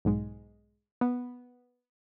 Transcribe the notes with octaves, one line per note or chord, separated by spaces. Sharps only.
B1 G#2 G#3
B3